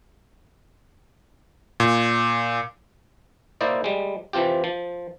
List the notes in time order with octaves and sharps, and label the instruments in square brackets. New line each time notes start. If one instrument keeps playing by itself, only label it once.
[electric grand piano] A#2
[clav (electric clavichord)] A#3 E4 C5 D5 D#5
G3 G#3
E3 F3 C4 F4 G4
F3